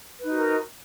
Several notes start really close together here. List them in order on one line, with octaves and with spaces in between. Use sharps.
B4 D#4 F#4 A#4